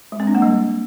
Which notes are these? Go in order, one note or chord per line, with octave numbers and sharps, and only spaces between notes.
G#3
C4
D4
A#3
G3